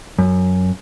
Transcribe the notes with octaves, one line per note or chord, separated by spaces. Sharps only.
F#2